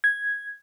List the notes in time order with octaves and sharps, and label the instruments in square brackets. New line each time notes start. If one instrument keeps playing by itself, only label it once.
[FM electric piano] G#6